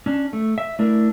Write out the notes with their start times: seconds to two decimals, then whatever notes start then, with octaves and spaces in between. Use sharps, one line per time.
0.06 C#4 D4
0.33 A3
0.58 E5
0.79 A3 D4 E4 A#4